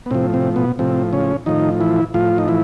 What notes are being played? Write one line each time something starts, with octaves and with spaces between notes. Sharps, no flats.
B3
A2 C3 F3 C4
C3 C4
B2 B3
A2 C3 F3 C4
C#3 C#4
A2 D#3 F3 D#4
E3 E4
A2 F3 F4
D#4
E3 E4